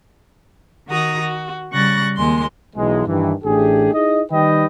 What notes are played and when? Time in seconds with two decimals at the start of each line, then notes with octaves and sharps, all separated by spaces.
0.88 D#3 F#4 A#5 D#6
1.20 F#4
1.73 C#3 G3 C#6 F#6 A6 A#6
2.17 D#2 G#3 C6
2.76 B1 E3 G#3
3.07 G2 D#3 E3
3.44 A1 A3 D4 G4 G#4
3.94 D#4 E4 G#4 D#5
4.32 D#3 G3 D#4 B4 D#5 G5